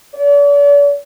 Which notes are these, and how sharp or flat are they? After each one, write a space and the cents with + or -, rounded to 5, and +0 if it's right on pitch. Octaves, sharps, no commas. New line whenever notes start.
D5 -45